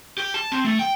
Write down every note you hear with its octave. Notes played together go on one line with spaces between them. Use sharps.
G4
A5
C4
A3
G5